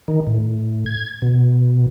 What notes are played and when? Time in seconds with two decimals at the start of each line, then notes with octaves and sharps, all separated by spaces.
0.08 D#3
0.27 A2
0.86 G#6
1.22 B2